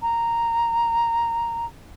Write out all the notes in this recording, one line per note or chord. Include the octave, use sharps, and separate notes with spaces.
A#5